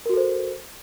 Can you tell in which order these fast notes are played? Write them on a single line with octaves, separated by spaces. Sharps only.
A#4 F#4 A4 C5